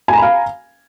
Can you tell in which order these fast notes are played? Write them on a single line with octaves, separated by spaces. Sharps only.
G#5 A#5 B5 F5